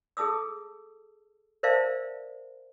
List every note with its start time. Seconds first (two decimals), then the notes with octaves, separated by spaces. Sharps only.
0.17 G#4 A4 A5 D#6 E6
1.63 A#4 C5 D5 E5 F5 A5